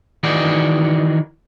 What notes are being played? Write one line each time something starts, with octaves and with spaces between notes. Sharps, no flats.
D#3 E3 D#4 F#4 G#4 D5